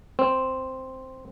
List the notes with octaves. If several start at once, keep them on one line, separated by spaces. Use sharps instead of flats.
C4